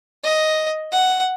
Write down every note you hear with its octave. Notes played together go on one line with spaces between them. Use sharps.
D#5
F#5